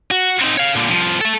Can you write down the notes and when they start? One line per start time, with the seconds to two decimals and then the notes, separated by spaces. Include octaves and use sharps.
0.11 F#4
0.42 C4 D#4
0.57 C#5 F5
0.75 A#2 D3
0.91 C2 F3
1.21 A3 A4